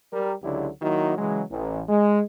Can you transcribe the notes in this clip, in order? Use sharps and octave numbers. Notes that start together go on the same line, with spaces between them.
G3 A#4
C#2 D3 F#3 D4 E4 G4
D#3 F#3 A#3 D#4 E4 F#4
C#3 E3 F#3 G#3
A1
G#3